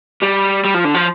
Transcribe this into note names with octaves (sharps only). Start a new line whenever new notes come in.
G3
G3
F3
D3
F3